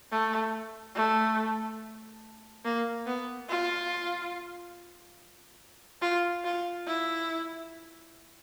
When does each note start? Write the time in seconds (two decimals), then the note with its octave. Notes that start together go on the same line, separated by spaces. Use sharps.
0.11 A3
0.95 A3
2.65 A#3
3.06 B3
3.49 F4
6.02 F4
6.45 F4
6.86 E4